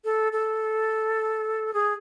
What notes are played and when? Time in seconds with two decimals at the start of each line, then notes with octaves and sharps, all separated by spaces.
0.05 A4
0.32 A4
1.74 G#4